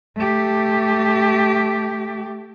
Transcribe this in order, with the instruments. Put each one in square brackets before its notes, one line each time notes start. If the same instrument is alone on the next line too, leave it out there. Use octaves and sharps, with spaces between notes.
[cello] A3 G4